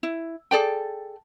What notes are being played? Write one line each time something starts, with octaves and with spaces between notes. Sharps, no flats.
E4
G#4 A4 D5 G5